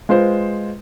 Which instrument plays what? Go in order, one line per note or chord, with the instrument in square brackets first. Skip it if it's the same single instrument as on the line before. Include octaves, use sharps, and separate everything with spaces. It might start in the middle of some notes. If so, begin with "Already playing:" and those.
[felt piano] G#3 F4 B4 C5